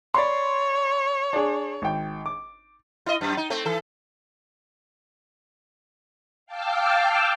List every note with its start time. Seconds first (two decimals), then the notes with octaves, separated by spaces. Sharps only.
0.14 C#5 D5 B5 C6
1.33 D4 G#4
1.82 G#1 G5
2.26 D6
3.06 E4 D#5
3.21 F#2
3.37 D#4
3.50 A3 C4
3.65 E3 A4
6.46 F5 G5 A5 D6 E6 F6